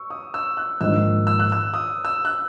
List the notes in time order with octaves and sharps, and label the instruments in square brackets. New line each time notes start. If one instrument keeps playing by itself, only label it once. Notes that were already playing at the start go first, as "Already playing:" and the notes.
Already playing: [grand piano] C#6 E6
D#6
E6
F#6
[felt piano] A#1 G#2 D#3 [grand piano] E6
[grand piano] E6
F#6
E6
D#6
E6
F#6